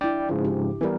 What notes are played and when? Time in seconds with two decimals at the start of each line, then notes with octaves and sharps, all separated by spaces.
0.01 D4 E4 D5 G5
0.29 G#2 C#3 F3
0.45 G4
0.81 E3 G3 B3 A#4